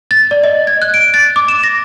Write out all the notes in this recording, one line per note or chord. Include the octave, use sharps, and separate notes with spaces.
A6
D5
D#5
G#6
F#6
D7
A6
D6
E7
A#6